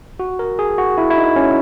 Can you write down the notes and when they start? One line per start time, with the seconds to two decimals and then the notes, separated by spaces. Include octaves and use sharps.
0.20 F#4
0.39 A#4
0.59 G#4
0.78 F#4
0.98 E4
1.10 E4
1.17 D#4
1.36 C#4